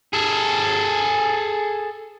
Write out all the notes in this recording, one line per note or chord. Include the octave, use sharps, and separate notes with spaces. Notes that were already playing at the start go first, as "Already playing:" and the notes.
G#4 A4